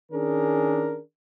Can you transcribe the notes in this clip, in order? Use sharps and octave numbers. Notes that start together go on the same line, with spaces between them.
D#3 C#4 D4 G#4 A#4